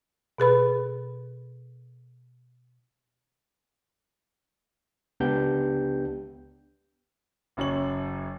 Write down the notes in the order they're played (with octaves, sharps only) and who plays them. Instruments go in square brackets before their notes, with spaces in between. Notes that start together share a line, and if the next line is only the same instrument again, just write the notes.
[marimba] B2 G#4 B4 B5
[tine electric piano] C#2 B3 D4 G4 G6
[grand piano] F#1 F#2 C#5 F#7